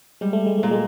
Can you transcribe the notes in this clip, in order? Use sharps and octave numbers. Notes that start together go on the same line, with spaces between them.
G3 G#3
A3
G#3
A#2 A3
G#3